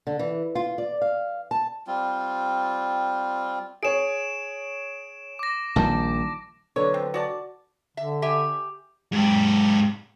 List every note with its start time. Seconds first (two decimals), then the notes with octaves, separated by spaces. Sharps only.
0.07 D3
0.19 E3
0.55 F4
0.78 D5
1.02 F5
1.51 A5
1.87 G3 C4 F4
3.83 G#4 C#5 D7 E7
5.39 D6 A#6
5.76 A#1 D#3 G3 A5
6.76 D3 F#3 B4 C#5
6.94 C4
7.14 F#4 D5 A5
7.97 D3 E5
8.22 G4 E5 G#5
9.12 G#2 G4